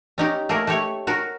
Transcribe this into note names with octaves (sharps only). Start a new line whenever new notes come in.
C#4 D#4 G4
A3 A#3 G#4 A#4
A3 G4 C#5
F#4 A#4